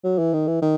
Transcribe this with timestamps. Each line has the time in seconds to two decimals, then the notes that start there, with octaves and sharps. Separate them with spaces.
0.04 F#3
0.18 E3
0.33 D#3
0.47 E3
0.62 D#3